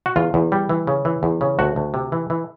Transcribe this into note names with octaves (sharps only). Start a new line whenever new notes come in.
F#4
E2 F4
E2
G3
E3
C#3
E3
E2
C#3
D2 F#4
D2
C3
E3
E3